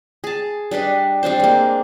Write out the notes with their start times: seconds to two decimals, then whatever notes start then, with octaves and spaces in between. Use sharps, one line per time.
0.24 G#4 A5
0.71 G3 D4 B4 D#5
1.23 G3 C4 D4 C5
1.40 G#3 A#3